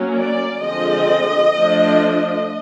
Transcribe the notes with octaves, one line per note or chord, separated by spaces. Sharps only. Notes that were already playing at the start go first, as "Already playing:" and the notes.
Already playing: F#3 A#3 C#4
D5
D3 F3 G#3 C4 D#5
F3 A3 D4